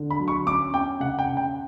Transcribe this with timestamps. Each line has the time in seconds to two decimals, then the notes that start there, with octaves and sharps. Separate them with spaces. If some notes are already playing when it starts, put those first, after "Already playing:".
Already playing: D3
0.10 B5
0.20 F#3
0.28 C#6
0.46 C#4 D6
0.74 C#4 G5
1.00 C#3 F#5
1.19 G5
1.28 C#3
1.37 G5